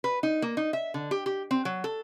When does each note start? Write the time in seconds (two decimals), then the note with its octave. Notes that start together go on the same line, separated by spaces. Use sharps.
0.04 B4
0.23 D#4
0.42 A#3
0.57 D#4
0.73 E5
0.94 D3
1.11 G4
1.26 G4
1.51 C4
1.65 F#3
1.84 A4